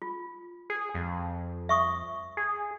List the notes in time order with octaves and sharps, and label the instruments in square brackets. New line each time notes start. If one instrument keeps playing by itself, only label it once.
[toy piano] F4
[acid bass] G#4
F2
[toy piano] E5 C#6 D#6
[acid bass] G#4